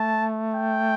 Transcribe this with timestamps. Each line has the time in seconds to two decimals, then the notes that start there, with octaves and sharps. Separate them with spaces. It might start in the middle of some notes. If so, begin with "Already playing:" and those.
Already playing: A3 A5
0.54 G5